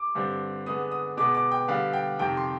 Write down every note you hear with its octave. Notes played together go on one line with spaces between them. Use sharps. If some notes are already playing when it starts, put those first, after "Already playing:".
Already playing: D6
G2 D3 G3 C4
D3 G#3 B3 D#6
D#6
B2 G#3 B3 D6
D6
G5
D3 G3 B3 F5
G5
F2 C3 D#3 G5
C6